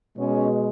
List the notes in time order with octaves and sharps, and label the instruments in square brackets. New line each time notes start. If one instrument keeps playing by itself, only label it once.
[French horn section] B2 G#3 C#4